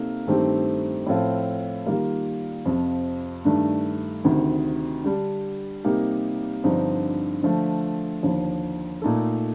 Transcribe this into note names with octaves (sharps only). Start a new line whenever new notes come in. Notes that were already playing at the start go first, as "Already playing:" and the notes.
Already playing: C3 A#3 D#4 A4
G2 D#3 A3 C4 G4
A2 F3 C4 F4 A4
D#3 G3 A#3 F4
F2 C3 F3
G2 D#3 A3 D4
D2 C3 D#3
D3 G3 D4
C3 G3 A#3 D#4 G4
G2 D3 F3 C4 D#4
D3 F3 A3
D#2 D3 F3
A#2 A3 D#4 A4